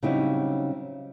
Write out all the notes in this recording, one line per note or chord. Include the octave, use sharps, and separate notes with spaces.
C#3 F#3 G3 C4 D#4 E4